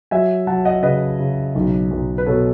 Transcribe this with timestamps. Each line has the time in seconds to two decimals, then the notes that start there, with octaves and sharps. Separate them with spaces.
0.11 F#3 E5 G#5
0.47 F#3 F#5 A5
0.65 D#5 F#5
0.83 C#3 B4 D#5
1.20 C#3
1.55 B1
1.91 B1
2.18 B4
2.27 B2 A4 C#5